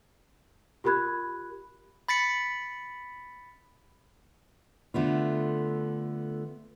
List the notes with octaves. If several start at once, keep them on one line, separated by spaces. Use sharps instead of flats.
F4 G4 A#4 B5 F#6 G#6
B5 A6 B6 C#7
D3 A3 B3 F4